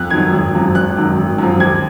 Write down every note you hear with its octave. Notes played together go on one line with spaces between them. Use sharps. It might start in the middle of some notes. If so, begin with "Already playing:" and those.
Already playing: F2 F#6
D#3 F#3 G#6
G#1
F#2 F3
G#1 F#6
F#2 D#3
G#1
F#2 F3
D#2 G#6